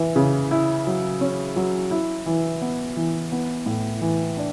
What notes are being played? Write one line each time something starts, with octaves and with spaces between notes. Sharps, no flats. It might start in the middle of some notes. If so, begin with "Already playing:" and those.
Already playing: E3
C#3
E4
F#3
C#4
F#3
E4
E3
B3
E3
B3
A2
E3
D4